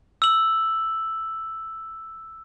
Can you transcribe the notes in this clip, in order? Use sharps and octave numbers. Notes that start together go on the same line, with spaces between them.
E6 F#7